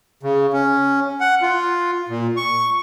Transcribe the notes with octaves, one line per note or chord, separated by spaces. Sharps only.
C#3
C#4
F#5
F4
A#2
C#6